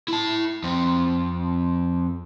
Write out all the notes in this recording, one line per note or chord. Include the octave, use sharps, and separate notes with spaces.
E4 A5
F2 C4